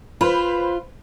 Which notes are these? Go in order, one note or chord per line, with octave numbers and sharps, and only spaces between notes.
F4 B4 C5 B5